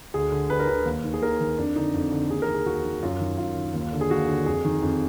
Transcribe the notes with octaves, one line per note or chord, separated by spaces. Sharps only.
D2 G#4
D3
D2 B4
A#4
D3 B4
D#2
D#3
G#4
D#2 A#4
D#3
F2 D4
D3 D#4
F2
D3
D#2 G#4
A#4
D#3
G#4
D#2 F#4
D#3
F#2 F4
D#3
F#2 F4
D#3
D#2
D3
G#4
D#2 F#4
D3
F2 G#4
D#3
F2